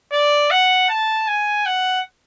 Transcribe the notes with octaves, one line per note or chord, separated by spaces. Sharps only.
D5
F#5
A5
G#5
F#5